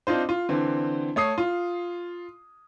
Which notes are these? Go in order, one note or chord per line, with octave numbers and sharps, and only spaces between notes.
C4 D4 D#4 F4 C5
F4
D3 E3 C4
A3 C#5 D#6 C7
F4